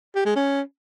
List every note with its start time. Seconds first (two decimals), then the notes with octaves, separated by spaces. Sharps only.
0.15 G4
0.26 G#3
0.36 C#4